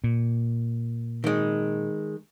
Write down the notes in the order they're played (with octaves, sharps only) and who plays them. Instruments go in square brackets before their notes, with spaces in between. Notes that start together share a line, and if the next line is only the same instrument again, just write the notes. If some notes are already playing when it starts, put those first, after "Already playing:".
[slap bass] A#2
[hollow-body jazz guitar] D#3 G#3